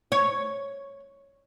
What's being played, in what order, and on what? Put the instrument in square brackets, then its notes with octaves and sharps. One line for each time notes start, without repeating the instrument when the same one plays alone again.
[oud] C#5